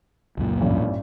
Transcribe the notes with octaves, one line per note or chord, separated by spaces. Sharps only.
C#2 F#2 A#2
A1 G2